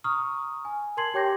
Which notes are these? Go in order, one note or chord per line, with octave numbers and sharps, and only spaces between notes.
A#5 C#6 D#6 F6
G#5
A#4 A5 C6 G#6 C7 F#7
G4 C#5 G5 D6 G6 A#6